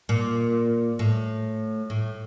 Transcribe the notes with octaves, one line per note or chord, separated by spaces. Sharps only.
A#2
A2
A2